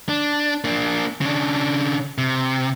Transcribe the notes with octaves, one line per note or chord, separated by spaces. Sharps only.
D4
A#3 D4
C#3 D4
C3